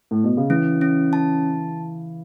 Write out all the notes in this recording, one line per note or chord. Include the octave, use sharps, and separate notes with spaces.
A2
B2
C#3
E3 C#4
C#4
A5